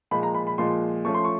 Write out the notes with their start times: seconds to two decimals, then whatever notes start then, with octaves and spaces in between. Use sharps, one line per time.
0.11 A#2 F3 G#3 B5
0.23 A#5
0.35 B5
0.47 B5
0.58 A#2 F3 G#3 C6
1.05 F3 A3 C#4 C#6
1.14 C6
1.25 C#6